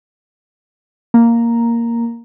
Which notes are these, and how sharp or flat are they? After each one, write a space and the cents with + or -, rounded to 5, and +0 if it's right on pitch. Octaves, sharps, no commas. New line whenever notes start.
A#3 +0 A#5 +0